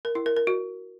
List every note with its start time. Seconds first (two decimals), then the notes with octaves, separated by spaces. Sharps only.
0.05 A#4
0.15 E4
0.26 A#4
0.37 A#4
0.47 F#4